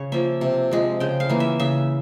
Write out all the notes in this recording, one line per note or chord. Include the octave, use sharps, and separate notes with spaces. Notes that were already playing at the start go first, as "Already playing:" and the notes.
Already playing: C#3 C#5
F3 A#3 E5
C3
F3 G#3
C#3 G5
F5
E3 A#3
E5
C#3 E5